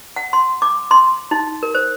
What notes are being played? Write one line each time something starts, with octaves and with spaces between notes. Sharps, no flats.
F#5
C6
D6
C6
D#4
A#4
C5